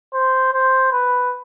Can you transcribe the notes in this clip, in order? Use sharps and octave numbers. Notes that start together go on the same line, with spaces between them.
C5
C5
B4